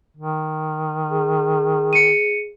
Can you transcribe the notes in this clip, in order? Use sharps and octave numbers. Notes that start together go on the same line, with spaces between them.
D#3
G#4
C#7 D#7